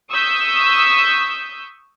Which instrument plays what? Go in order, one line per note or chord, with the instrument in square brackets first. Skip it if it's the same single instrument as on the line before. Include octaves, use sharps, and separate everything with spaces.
[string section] C#6 D#6 E6 G6 B6